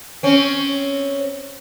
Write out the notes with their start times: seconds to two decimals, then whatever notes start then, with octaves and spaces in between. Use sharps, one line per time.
0.23 C4 C#4